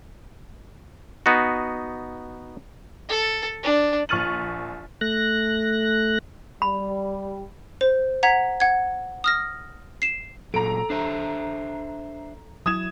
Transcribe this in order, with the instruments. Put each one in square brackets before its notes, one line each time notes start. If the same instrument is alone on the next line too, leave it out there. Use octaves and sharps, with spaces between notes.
[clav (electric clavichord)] B3 D#4 F#4
[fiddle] A4
D4
[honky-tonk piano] A#1 C#6 F6 A6 D#7 F#7
[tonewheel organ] A3 F#6 A#6
[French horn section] G3 [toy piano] B5
[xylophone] C5
F#5 A#5 G#6 B6
F#5 G#6
D#6 F6 A#6
C7 E7
[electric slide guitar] A#2 F#3 [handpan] A4 [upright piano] A#5 D7
[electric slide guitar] D4 C5 E5
[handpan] F#3 E4 [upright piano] D#6 G#6 E7